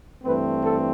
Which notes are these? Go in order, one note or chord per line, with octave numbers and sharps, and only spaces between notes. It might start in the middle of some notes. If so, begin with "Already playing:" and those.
G2 E3 A3 C4 B4
A4